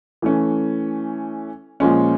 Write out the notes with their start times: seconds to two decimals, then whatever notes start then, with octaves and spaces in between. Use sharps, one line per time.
0.22 E3 A3 C#4
1.80 A#2 F3 G#3 C#4